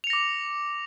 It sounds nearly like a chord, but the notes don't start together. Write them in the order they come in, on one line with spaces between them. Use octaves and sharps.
F7 C#7 A#6 D6